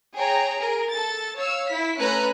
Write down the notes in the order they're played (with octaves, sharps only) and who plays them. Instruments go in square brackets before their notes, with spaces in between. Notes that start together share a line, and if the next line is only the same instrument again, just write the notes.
[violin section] G#4 C#5 G5 A#5
G#4 A#4
A4 A6
C#5 F5 E6
E4 B6
A3 C#4 B4 G#5 A#5 F#6